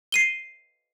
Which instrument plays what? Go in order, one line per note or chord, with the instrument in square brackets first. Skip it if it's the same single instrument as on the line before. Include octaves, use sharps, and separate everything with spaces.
[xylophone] C7 D#7 G7